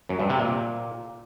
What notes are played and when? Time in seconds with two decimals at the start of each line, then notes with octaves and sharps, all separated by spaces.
0.09 F#2
0.20 G2
0.30 C3
0.40 A#2